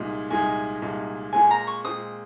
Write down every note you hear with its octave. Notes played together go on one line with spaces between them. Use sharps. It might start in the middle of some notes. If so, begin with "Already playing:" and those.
Already playing: C2 A#2 G#3 D#4
C2 A#2 G#3 D#4 G#5
C2 A#2 G#3 D#4
A#2 G#3 C4 G#5
A#5
C#6
A#2 G#3 C4 D#6